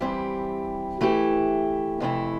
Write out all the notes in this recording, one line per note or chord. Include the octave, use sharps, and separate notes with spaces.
E3 G3 C4 E4 G4
E3 A3 E4 G4
F2 C3 E3 A3 E4